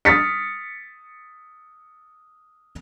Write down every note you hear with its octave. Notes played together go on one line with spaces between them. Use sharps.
D#6 F6 A6 B6 C#7